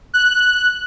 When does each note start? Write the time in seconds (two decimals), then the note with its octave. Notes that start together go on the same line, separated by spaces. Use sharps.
0.14 F#6